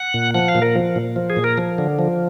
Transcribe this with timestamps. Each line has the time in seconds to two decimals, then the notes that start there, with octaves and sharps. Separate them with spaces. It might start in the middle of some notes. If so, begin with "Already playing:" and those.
Already playing: F#5
0.14 A#2
0.35 F3 F#5
0.48 F5
0.55 A#2
0.62 A#4
0.75 F3
0.96 A#2
1.16 F3
1.30 G#4
1.36 A#2
1.44 A#4
1.58 F3
1.78 D3
1.99 F3